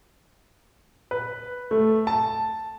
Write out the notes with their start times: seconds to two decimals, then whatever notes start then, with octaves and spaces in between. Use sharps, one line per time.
1.11 B4
1.71 A3
2.07 A5